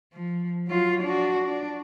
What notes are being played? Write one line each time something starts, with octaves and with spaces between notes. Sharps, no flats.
F3
F#3 F4
D4 F#4
D4